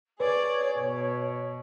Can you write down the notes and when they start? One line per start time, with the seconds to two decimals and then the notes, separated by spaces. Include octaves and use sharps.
0.20 G#4 B4 C#5 D5
0.78 B2